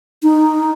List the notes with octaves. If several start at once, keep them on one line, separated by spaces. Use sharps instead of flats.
D#4